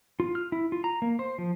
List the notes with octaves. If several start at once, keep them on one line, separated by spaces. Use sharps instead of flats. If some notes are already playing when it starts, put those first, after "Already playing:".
F4
F6
E4
F4
A#5
A#3
C5
F3